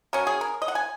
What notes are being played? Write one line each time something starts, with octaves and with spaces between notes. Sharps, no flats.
F#3 C#4 A#4
G#4
A#4
D#5
F#5
G#5